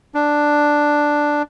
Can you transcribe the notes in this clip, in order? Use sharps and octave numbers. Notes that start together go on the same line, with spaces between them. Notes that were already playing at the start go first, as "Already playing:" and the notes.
D4